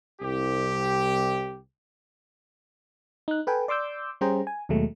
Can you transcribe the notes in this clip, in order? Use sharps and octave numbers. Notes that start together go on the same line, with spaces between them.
C2 G4
D#4 F#6
A4 B4 G5 G#5
D5 C6 D6 E6 G6
G3 C#4 G#4 C5 G5 A#5
G#5
D#2 B2 F#3 G#3 A3